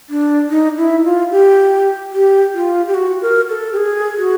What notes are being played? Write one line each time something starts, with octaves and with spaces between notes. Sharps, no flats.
D4
D#4
E4
F4
G4
G4
F4
G4
F#4
A#4
A4
G4
G#4
F#4